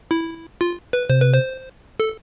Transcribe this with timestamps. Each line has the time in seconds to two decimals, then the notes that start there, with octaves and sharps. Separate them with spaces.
0.11 E4
0.61 F4
0.93 B4
1.09 C3 C5
1.21 B4
1.33 C5
2.00 A4